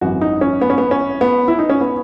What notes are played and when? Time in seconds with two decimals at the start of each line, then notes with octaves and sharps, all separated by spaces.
0.01 G#1 F#2 E3 F#4
0.21 D#4
0.41 C#4
0.61 B3
0.70 C#4
0.78 B3
0.91 C#4
1.21 B3
1.48 E4
1.59 D#4
1.70 C#4
1.81 B3